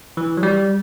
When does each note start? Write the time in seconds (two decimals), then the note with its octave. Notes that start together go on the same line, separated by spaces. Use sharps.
0.17 E3
0.37 F#3
0.43 G3